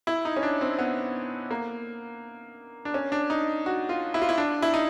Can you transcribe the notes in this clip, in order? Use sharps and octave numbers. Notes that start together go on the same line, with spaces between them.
E4
D#4
C#4
D4
C4
B3
A#3
D4
C#4
D4
D#4
F#4
F4
E4
F4
E4
D4
E4
D#4